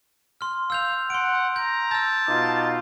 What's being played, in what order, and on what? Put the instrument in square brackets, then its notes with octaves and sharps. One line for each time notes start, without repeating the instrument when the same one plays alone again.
[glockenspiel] C6 F6
[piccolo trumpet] F5 [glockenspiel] E6 G6 F7
[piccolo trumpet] F#5 [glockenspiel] C6 D7
[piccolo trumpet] A#5 [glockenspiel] G6
[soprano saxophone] A5 [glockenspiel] E6 G6
[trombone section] B2 D#4 F4 [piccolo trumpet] D6